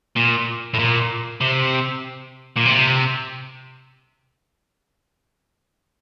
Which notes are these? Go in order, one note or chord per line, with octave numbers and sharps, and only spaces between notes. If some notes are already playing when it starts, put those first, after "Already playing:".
A#2
A2
A#2
C3
A#2
C3